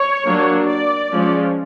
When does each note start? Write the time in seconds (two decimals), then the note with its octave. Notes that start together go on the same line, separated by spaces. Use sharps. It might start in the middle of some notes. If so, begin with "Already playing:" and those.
Already playing: C#5
0.25 F#3 A#3 D4
0.68 D5
1.11 F3 G#3 C#4